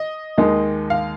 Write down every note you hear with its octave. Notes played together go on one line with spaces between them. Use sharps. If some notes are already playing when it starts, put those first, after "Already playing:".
Already playing: D#5
D#2 D#3 G#3 D#4
F5